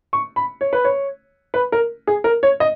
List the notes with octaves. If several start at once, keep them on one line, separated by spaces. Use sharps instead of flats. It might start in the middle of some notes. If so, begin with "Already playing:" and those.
C#6
B5
C#5
B4
C#5
B4
A#4
G#4
A#4
C#5
D#5